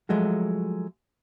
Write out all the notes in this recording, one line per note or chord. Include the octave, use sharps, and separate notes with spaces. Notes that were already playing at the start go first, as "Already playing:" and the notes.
F3 F#3 G#3 A3 F#4